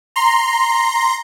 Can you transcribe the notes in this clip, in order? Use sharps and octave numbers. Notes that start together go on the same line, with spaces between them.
A#5 C6